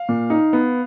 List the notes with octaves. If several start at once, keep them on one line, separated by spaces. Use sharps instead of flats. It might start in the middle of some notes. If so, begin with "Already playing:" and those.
Already playing: F5
A#2
D#4
B3